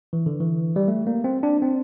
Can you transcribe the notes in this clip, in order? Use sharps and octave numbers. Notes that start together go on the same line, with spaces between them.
E3
D3
E3
G3
A3
A#3
C4
D4
C4